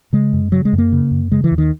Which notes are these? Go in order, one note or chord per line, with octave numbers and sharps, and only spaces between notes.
C#3 G#3
F#2
C#3 F#3
G#3
F#2
A#3
C#3
F#2
C#3 G#3
E3
D#2
D#3